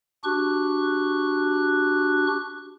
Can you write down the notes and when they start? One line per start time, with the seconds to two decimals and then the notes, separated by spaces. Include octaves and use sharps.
0.24 D4 F#4 G4 C#6 F#6